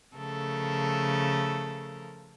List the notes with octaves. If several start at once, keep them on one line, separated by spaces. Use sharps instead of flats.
C#3 F3 A3 A4 A#4